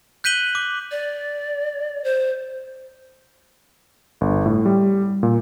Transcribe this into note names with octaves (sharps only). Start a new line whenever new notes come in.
F#6 G6 B6 D#7 F#7 G7
D6
D5
C5
G1
A2
G3
A#2